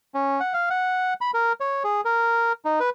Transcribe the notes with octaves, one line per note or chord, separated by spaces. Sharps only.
C#4
F#5
F5
F#5
B5
A#4
C#5
G#4
A#4
D#4
B4